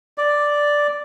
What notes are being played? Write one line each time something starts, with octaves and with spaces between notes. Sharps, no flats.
D5